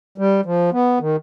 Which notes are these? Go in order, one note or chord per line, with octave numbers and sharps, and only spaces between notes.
G3
F3
B3
D#3